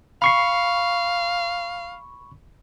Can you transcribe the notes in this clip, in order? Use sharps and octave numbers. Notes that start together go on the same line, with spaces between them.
F5 B5 C#6 C7